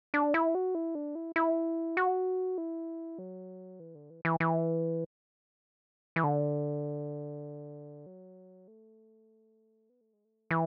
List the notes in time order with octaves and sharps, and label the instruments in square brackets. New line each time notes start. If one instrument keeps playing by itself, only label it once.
[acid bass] D4
E4
F#4
E4
D4
E4
E4
F#4
E4
F#3
E3
D3
E3
E3
E3
E3
D3
F#3
A3
B3
A3
G#3
A3
E3